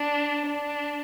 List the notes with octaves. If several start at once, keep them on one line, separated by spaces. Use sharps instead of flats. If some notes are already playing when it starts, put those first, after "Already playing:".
Already playing: D4
D4